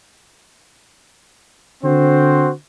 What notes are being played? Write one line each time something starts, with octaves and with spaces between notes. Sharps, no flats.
D3 C4 F#4 C5